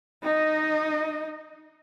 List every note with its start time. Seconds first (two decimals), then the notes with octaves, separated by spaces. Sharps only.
0.23 D#4 D#5